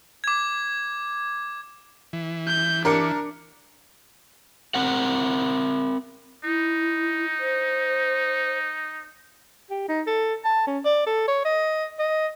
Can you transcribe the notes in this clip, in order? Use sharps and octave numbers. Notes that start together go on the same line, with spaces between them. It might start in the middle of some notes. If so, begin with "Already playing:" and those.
D6 G#6
E3
G6
D4 A#4 D6 C#7
C4 A#4 F#5
D#4 E4
C5
G4
D#4
A4
A5
C#4
D5
A4
C#5
D#5
D#5